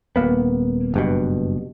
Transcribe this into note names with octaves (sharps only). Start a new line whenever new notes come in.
D#1 A#2 A#3 B3
F#1 G2 B2